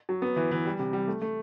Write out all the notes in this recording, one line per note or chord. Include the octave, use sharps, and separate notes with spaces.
F#3
B3
E3
E3
G3
C3
G3
A3
A3